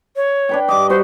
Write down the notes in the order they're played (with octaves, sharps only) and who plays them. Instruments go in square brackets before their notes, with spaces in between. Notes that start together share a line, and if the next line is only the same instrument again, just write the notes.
[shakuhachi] C#5
[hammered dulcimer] D4 B4 G5
[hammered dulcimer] G2 D#5 [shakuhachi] D6
[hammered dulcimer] G3 F#4 [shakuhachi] C5